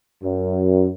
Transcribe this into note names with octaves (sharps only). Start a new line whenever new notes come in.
F#2